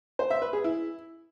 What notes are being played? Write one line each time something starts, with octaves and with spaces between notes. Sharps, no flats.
C5
E5
B4
G#4
E4